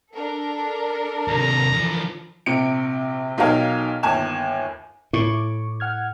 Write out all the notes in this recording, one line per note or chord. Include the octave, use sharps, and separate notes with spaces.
D4 A4 A#4
D#2 C3 A#5
E3 F3
A#1 C3 C#7 D7
B1 D#4 G4 A#4 F5 G#5
G1 D#2 G#5 E7
A2 E4 C#6 D6
F#5 F6 G#6